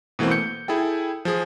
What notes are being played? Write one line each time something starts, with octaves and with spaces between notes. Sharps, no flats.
B2 E3 A3 A#3 C4
G6 C#7
E4 G#4 A4 G5
F3 G#4